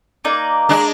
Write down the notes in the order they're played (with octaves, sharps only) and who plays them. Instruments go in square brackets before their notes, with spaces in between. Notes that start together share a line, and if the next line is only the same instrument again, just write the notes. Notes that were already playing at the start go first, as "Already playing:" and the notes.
[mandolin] A#3 D#4 D5
[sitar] G#3 D4